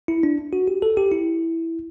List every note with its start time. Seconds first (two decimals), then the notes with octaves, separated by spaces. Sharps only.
0.08 E4
0.23 D4
0.53 F#4
0.68 G4
0.82 A4
0.97 G4
1.11 E4